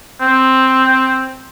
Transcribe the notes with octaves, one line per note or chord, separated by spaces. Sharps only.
C4